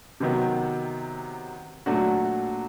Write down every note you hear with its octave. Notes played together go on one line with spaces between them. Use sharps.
C3 D#3 F#3 B3
A#2 F#3 A3 D4 F#4